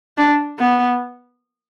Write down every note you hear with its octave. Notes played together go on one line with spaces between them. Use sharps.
D4
B3